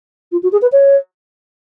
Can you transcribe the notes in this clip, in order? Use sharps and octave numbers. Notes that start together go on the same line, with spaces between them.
F4
F#4
G#4
B4
C#5